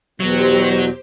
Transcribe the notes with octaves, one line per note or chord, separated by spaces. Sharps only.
E2 B2 F#3 G4 C5